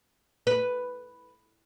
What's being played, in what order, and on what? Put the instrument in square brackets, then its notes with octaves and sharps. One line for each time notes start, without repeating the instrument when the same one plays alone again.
[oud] B4